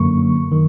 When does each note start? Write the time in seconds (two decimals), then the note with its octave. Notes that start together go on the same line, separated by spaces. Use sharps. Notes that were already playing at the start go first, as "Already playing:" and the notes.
Already playing: F#2 D3 F#3 A#3 C#6
0.52 D#3